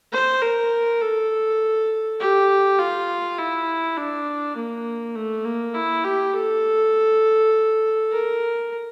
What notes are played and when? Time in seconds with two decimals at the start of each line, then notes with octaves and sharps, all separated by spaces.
0.12 C5
0.42 A#4
1.01 A4
2.20 G4
2.79 F4
3.38 E4
3.97 D4
4.56 A#3
5.15 A3
5.45 A#3
5.74 E4
6.04 G4
6.33 A4
8.11 A#4